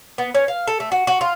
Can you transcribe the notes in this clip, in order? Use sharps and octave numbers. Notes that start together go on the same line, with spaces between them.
B3
C#4
F5
A4
A3
F#4
F#4
F4